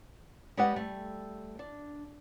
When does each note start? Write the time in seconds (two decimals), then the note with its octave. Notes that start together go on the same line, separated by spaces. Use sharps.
0.57 G#3 B3 G4 D5 D#5 F#5
0.76 G3 A3
1.59 D4